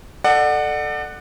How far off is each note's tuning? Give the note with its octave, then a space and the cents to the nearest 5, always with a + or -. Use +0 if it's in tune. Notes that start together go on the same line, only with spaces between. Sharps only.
A4 +0 D5 +35 F#5 +0